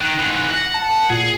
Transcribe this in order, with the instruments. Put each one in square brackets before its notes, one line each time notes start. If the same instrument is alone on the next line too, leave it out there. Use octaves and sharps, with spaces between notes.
[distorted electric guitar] D#3 [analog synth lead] F#6
[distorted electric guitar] G#2 E3
[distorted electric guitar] F#5 [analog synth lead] A#6
[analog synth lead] A5
[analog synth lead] A#2 [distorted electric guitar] G#4